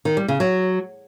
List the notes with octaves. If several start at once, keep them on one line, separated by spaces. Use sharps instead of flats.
D#3
G3
C#3
F#3